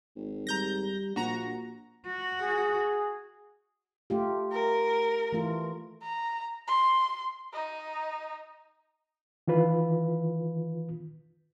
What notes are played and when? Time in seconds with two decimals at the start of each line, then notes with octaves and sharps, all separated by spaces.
0.16 G#1
0.47 G3 A#5 G6 A#6
1.16 A#1 A#2 F#4 A#5
2.07 F#4
2.42 G#4
4.10 A3 F4 G4
4.51 A#4
5.32 E3 A3 F4
6.02 A#5
6.67 C6
7.53 D#4
9.48 D#3 E3 F4 B4